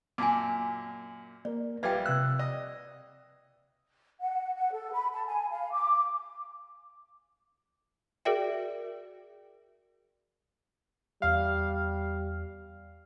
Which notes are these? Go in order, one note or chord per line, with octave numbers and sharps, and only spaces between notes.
F#2 A#2 G#5 A5 D6
A#3 A#4 D5
A#1 G3 F4 B4 E5 G5 G#6
C3 E6 F#6
D5 D#5
F#5
F#5
A4
B5
A5
G#5
F5
D6
F#4 G#4 A#4 D5 E5 G5
E2 G3 F5 F6